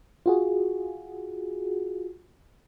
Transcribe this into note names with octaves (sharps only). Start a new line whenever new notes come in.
F4 F#4 G#4